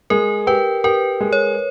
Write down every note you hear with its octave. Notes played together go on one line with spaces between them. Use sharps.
G#3 A#4
G4 B4
G4 A#4
G#3
C#5